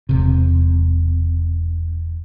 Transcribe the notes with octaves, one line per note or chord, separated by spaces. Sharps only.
E1 C3